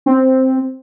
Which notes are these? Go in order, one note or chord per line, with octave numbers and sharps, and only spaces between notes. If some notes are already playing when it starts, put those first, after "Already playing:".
C4